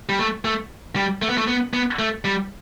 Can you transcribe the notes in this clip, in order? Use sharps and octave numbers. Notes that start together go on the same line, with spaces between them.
G3
A3
A3
G3
A3
B3
A3
B3
B3
A3
G3